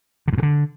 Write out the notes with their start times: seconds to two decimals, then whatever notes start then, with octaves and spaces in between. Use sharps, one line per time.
0.28 D3
0.33 G2
0.38 B2
0.43 D3